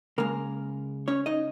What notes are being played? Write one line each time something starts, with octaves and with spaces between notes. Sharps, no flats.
C#3 G#3 A#3 A#4
C#4 C#5
D#4 D#5